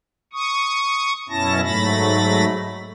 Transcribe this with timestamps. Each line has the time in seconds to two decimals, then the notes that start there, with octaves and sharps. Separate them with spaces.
0.33 C#6 D#6
1.29 F#2 B2 C#4 E4 A5 A#6
1.63 G#2 F#3 A3 B5 A6 A#6